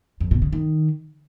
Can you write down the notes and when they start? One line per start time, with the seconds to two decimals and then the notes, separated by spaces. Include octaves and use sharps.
0.21 F2
0.31 B2
0.42 C#3
0.53 D#3